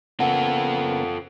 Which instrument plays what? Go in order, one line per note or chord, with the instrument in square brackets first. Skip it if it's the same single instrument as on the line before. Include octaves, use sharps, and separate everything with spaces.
[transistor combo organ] C#3 A#3 B3 [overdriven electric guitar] F4 A4 [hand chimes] F#5